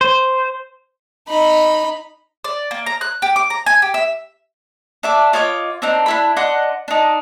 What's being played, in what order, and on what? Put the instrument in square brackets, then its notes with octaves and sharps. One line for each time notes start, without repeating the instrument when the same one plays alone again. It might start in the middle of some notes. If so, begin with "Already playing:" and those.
[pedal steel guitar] C5
[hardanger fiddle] D#4 B5
[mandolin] D5
A#3
A#5
F#6
G4
D6
A#5
G#5
G4
E5
D4 E5 D6
F4 C#5 D#5 D6
C4 D4 D#4
D4 E4 B5
D4 D#5 F#5 C6
D4 D#4